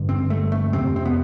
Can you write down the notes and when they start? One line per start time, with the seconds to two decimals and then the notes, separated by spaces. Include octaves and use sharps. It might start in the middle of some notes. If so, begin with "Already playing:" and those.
Already playing: G2 D3
0.09 C4
0.30 A3
0.52 A3
0.73 F2 C3 C4
0.96 C4
1.05 B3